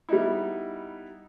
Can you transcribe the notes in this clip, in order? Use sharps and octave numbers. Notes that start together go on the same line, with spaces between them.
G3 B3 D#4 E4